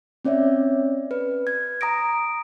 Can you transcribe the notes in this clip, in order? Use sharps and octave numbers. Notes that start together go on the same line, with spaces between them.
C4 C#4 C#5 D5 E5
B4
G#6
A#5 D#6 A#6 D7